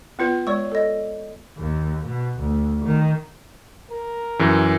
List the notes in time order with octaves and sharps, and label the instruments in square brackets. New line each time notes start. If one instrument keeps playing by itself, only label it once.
[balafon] B3 F4 B4
[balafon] G#3 [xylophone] C#5 D5 C#6
[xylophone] A4 D#5
[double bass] D#2
B2
D2
D#3
[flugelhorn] A#4
[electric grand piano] F#2 E3